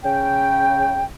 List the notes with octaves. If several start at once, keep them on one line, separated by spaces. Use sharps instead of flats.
C#3 G5